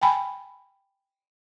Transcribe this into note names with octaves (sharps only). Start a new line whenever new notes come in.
G5 G#5 B5